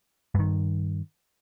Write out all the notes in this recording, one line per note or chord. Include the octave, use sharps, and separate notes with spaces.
G2 D#3